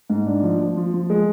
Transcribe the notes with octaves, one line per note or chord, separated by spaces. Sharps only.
G#2
D4
F3
F3
F3
F3
G#3